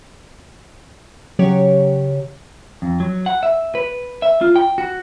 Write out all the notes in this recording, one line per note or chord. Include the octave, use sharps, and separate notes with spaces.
C#3 F#3 G4 C#5
F2
F#3
F#5
E5
B4
E5
F4
G5
F#4